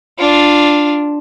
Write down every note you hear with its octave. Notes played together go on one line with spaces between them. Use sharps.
D4 F4